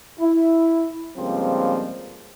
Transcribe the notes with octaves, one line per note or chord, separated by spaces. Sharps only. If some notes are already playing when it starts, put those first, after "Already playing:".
E4
G2 C#3 F3 G#3 A#3 C4